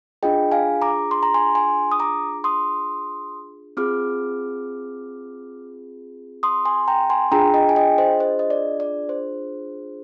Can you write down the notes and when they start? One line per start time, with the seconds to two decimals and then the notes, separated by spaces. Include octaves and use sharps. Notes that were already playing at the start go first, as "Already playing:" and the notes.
0.23 D4 F4 G#4 D#5 G5
0.52 F5 G#5
0.82 A#5 D6
1.11 C6
1.23 A#5
1.34 G#5 C6
1.55 G#5 C6
1.92 D#6
1.99 A#5 D6
2.44 C6 D#6
3.77 C4 F4 G#4 D6 F6
6.43 C6 D#6
6.65 G#5 C6
6.88 G5 A#5
7.10 G#5 C6
7.32 D4 F4 G#4 G5 A#5
7.54 D#5 G5
7.69 G#5
7.76 D#5 G5
7.98 C5 D#5
8.20 C5
8.39 D#5
8.50 D5
8.80 D5
9.09 C5